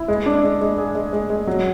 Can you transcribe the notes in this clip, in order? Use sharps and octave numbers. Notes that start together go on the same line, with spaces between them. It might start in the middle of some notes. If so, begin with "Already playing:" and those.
Already playing: E4
G#3
D4
G#3
G#3
G#4
G#3
G#3
G#3
F#3